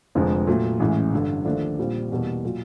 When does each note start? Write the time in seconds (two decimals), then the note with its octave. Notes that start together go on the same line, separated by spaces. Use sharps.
0.15 F1 F2 D3 F3 G#3
0.47 A#2 F#3 A3
0.80 A1 A2 E3 G#3 C#4
1.13 G1 G2 D3
1.45 D#2 D3 F3 A3 D4
1.78 A#1 A#2 G3 C4
2.11 E2 B2 G3 A#3
2.45 A#2 F#3